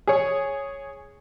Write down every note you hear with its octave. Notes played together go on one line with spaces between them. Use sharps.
G#4 C#5